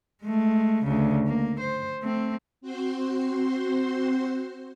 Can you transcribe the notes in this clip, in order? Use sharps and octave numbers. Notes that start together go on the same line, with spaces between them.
G#3 A3
D2 C#3
A#3
C5
A3 C4
C4 F#4 C5 C6